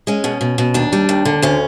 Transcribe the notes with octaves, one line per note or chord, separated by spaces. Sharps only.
G#3 C#4
B2
B2
B2
D#2 D4
G3
D#2
D3
D2 C#4